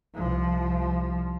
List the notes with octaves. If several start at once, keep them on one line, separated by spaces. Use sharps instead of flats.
C2 F3